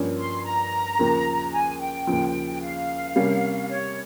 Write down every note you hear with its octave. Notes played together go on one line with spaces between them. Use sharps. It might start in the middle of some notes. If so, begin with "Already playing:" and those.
Already playing: G2 F3 A#3 C#4
C6
A#5
D#2 C#3 F3 A#3
G#5
G5
D#2 C#3 F3
F5
C3 G3 A#3 C#4
C#5